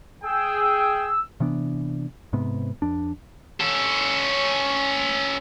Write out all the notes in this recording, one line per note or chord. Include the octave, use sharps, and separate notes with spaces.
G#4 G5 E6
C3 E3 B3 D4
G#2 C3 B3
F2 D4
C#4 A4